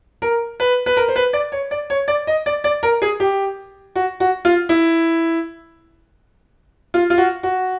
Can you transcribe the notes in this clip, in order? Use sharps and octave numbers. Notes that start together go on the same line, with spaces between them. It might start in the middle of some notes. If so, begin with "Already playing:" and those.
A#4
B4
B4
A#4
C5
B4
D5
C#5
D5
C#5
D5
D#5
D5
D5
A#4
G#4
G4
F#4
F#4
F4
E4
F4
F4
F#4
F#4